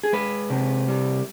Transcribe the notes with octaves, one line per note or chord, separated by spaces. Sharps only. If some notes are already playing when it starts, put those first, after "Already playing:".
G#4
G#3 B4
C3
G3